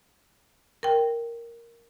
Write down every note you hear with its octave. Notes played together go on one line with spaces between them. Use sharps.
A#4 G5